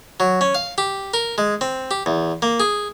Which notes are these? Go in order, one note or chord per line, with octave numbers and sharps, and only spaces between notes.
F#3
C#4
F5
G4
A#4
G#3
C4
G4
E2
A#3
G#4